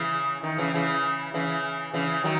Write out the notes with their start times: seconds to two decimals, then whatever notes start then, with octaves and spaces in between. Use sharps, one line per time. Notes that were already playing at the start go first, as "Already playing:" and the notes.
Already playing: C#3 E3
0.43 D#3
0.58 C#3 E3
0.74 C#3 E3
1.34 C#3 E3
1.94 C#3 E3
2.24 D#3 F#3